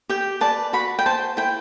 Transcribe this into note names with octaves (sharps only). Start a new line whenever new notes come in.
G4 G5
B4 D5 A5
F#4 B5
G5
C5 A5
E4 G5